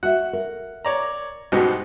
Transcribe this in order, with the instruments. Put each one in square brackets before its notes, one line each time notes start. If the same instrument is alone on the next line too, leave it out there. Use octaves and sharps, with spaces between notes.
[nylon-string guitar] F#4 E5 [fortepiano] F#5
[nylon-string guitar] A#4
[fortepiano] C#5 D5 A#5
[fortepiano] C2 G#2 B2 [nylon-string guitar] F#4